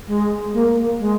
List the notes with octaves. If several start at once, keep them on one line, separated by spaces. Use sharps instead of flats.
G#3
A#3
A#3
G#3